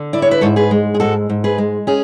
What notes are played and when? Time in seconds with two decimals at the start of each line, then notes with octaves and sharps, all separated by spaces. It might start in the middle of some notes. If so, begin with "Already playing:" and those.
Already playing: D3
0.13 E4 D5
0.22 C#5
0.31 B4
0.41 G#2 A4 C#5
0.56 G#4 B4
0.71 G#3
0.94 G#4
1.00 G#2 F#4 A4
1.29 G#2
1.44 G#4 B4
1.58 G#3
1.87 C#4 G#4